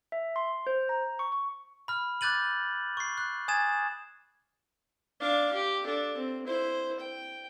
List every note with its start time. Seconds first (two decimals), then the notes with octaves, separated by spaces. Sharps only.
0.12 E5
0.36 C6
0.67 C5
0.89 A#5
1.19 C#6
1.32 C#6
1.88 B5 F6
2.21 D6 F#6 G6 A6 D#7 F#7
2.97 C#6 C7
3.18 F#6
3.48 G#5 D#6 G#6 A6 E7
5.20 D4 F5
5.53 G4
5.83 D4 A4
6.17 C4
6.47 E4 C5
7.00 G5